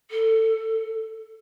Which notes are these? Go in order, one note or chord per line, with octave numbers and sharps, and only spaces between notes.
A4